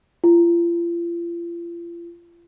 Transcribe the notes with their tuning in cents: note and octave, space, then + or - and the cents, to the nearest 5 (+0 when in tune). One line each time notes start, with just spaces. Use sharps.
F4 -40